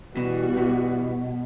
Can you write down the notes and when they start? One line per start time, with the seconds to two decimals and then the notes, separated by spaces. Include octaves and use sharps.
0.16 B2 E3 G3 B3 F#4
0.57 B2